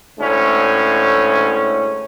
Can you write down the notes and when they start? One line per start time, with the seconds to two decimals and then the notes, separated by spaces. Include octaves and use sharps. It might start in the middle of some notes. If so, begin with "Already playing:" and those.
0.19 D2 A2 G#3 C#4